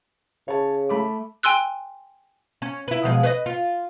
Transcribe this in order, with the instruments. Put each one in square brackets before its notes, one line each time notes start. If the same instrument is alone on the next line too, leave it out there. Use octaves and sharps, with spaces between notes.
[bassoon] C#3 [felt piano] C#5 A5
[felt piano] A3 B5 D6
[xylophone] G5 G#5 C6 E6 F#6
[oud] C#4
E4 B4
B2 F3 G#3
B4 C#5 D#5
F4